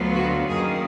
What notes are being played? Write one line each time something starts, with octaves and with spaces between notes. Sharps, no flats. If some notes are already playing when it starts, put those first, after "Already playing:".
Already playing: D2 D3 F#3 B3 F4
F#4
F#2 D#3 A#3 G#4